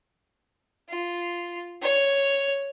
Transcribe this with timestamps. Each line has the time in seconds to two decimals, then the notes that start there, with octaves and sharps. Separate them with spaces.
0.89 F4
1.82 C#5